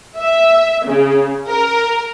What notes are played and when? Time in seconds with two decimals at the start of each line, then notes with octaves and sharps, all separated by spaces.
0.19 E5
0.86 C#3
1.48 A#4